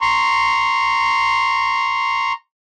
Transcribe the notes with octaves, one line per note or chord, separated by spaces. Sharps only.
A#5 C6 C#6